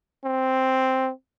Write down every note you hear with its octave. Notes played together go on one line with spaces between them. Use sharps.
C4